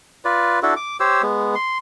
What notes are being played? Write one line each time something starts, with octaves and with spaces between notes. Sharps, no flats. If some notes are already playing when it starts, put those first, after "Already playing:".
F4 B4 D5
D4 E4 F#4 A4
D6
G4 C5 C#5 E6
G#3 B3
C6